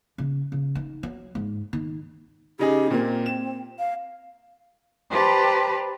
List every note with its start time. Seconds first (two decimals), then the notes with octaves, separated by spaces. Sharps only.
0.18 C#3
0.52 C#3
0.75 D#4
1.03 F#3
1.35 G#2
1.73 D#3
2.59 C#3 D#4 G4 G#4
2.90 A#2 A#3 C4
3.26 E7
3.79 F5
5.11 G4 B4 C5 D5 A5 A#5